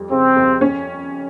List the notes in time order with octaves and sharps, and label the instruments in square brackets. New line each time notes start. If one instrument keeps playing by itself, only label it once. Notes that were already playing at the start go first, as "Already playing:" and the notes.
Already playing: [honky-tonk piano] F2 G3
[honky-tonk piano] C#3 [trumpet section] C4
[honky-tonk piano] F2
C#4